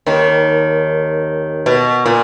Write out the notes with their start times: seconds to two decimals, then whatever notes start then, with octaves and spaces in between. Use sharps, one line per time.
0.06 D#2 D#3
1.66 B2
2.06 A#2